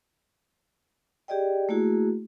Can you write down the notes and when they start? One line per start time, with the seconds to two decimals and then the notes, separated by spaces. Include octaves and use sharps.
1.28 G4 G#4 D5 D#5 G5
1.69 A3 A#3 E4 F#4 G#4